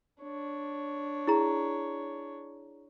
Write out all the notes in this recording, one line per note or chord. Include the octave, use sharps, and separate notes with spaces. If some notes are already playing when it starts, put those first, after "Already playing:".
D4 C#5
E4 G#4 A#5